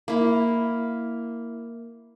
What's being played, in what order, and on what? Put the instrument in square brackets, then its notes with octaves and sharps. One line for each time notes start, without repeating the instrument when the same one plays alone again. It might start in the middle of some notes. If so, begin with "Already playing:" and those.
[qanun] A#3 E4